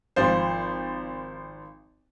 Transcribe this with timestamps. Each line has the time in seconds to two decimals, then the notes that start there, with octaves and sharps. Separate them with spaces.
0.16 G#1 F3 C5